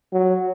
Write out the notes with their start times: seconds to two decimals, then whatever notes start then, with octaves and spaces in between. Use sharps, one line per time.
0.13 F#3